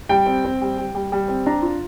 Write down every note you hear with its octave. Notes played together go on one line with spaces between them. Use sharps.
G3 G5
C4
C4
G3
G3
G3
G3
C4
D4 A#5
F4